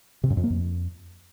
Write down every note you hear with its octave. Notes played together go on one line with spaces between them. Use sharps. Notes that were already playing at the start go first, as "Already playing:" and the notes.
C3
F#2
F2
A#3
F2